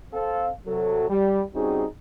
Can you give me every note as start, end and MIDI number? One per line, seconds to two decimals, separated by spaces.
0.14 0.49 60
0.14 0.49 69
0.14 0.49 77
0.66 1.07 48
0.66 1.07 54
0.66 1.07 69
1.09 1.42 55
1.55 1.85 55
1.55 1.85 60
1.55 1.85 61
1.55 1.85 63
1.55 1.85 66
1.55 1.85 68